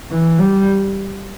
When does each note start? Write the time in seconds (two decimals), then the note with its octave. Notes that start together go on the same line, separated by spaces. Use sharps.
0.11 E3
0.38 G3